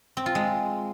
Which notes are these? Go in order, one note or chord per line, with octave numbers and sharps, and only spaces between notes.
C4
F4
G#3